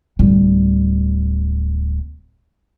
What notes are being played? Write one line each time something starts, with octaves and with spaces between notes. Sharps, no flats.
D1 G3